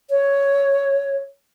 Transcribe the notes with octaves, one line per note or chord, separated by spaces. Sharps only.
C#5